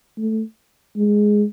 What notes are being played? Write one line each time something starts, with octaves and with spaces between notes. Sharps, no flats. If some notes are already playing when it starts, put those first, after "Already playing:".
A3
G#3